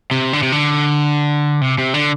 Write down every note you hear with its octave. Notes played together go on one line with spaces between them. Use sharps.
C3
D3
C3
D3
C3
C3
D3